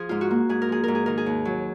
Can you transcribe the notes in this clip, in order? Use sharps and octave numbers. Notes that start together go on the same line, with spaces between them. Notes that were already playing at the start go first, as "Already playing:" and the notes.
Already playing: F3 G#4
G#2 F4
F#4
A#3
G#2 G#4
A#4
F3 G#4
G#2 A#4
G#4
D#3 A#4
G#4
D#2
F#3